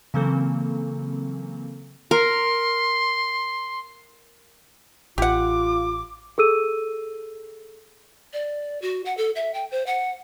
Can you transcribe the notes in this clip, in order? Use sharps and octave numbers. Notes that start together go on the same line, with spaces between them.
C#3 E3 F#3 A#3 C4 A4
A#4 C6
A1 F4 G4 F#5 D6
G#4 A4 E6 D#7
D5
F#4
F#5
A4
E5
G5
C5
F#5